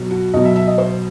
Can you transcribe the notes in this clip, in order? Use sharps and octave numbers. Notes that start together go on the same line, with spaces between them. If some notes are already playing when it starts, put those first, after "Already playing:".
Already playing: B2 F#3
F#4
B2 F#3 D#5
E5
E5
D#5
C5